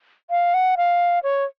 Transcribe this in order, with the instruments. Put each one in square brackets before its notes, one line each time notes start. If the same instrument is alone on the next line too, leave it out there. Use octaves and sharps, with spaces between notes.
[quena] F5
F#5
F5
C#5